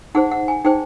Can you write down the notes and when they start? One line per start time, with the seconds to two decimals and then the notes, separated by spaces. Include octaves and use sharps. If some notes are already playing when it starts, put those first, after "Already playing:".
0.15 D#4 G#4 C5 F#5
0.31 F#5
0.48 G#5
0.64 D#4 G#4 C5 G5